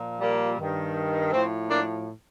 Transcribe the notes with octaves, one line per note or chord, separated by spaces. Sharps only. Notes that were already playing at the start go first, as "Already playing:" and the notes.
Already playing: A#2 F3
G3 A#3
G2 D#3
A2 F3 A3 C4
A#3 D4